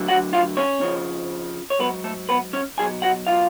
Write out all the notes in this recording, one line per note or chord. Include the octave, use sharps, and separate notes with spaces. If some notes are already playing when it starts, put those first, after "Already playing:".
Already playing: D2 D3 F#3
F#4 F#5
F4 F5
C#4 C#5
F2 C#3 F3
C#5
G#2 F#3 B3 B4
A3 A4
B3 B4
C#4 C#5
B1 B2 F#3 G#4 G#5
F#4 F#5
F4 F5